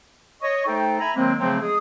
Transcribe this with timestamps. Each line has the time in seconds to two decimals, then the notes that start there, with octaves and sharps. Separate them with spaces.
0.42 C#5 D#5 C#6
0.67 A3 D#4 A4 C5 G5
1.00 E5 G#5 A#5 B5
1.16 D#3 F#3 G#3 A#3 C4
1.39 C#3 F3 F#3 A3 C4
1.60 G#3 G#4 D#6